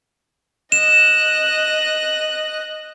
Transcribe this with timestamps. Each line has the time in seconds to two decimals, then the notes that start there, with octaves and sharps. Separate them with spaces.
0.72 D#5 F#6 E7